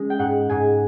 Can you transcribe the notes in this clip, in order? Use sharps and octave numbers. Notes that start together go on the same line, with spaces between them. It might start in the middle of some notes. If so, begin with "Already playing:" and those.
Already playing: C#3 G#3
G5
G#2 F#5
G#2 G#5